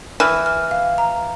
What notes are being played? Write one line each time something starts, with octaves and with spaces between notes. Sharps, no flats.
E3 F6
F6
F5
A#5